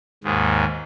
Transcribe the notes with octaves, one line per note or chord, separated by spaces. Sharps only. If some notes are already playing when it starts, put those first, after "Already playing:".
D#2 G#2